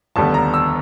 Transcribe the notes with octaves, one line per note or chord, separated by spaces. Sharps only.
F1 D#2 D3 G3 B3 A5
A#5
E6